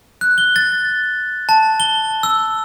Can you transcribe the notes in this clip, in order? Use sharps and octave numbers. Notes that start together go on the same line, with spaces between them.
F#6
G7
A6
A5
G7
E6